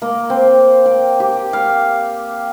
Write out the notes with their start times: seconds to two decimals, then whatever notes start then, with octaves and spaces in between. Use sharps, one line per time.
0.02 A#3
0.30 C4
0.86 G5
1.20 G4
1.53 F5